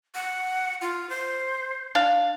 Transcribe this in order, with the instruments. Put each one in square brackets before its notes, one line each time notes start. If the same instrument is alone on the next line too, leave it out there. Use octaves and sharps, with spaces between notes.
[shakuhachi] F#5
F4
C5
[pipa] D4 F5